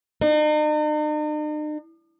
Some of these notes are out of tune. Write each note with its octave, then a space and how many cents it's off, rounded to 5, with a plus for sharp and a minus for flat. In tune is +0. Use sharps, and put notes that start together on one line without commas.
D#4 -45